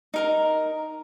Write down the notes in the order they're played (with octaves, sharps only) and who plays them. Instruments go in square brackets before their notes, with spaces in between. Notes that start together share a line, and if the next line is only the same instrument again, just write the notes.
[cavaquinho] D#4 A#4 A#5